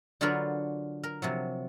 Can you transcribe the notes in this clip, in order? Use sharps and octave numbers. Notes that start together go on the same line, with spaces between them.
D3 F#3 D4 F4 A#4 B4
A#4
C3 F3 F#3